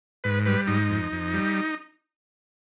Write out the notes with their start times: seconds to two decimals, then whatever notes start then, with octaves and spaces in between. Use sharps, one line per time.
0.24 G#2 B4
0.46 G3 B4
0.67 G#2 D#4
0.90 F2
1.12 F2
1.34 G3